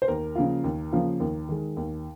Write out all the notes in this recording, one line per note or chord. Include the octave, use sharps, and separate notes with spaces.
C5
D#2 A#4
C#3 F3 A#3 F4
D#2
C#3 F3 A#3 F4
D#2
D#3 G#3
D#2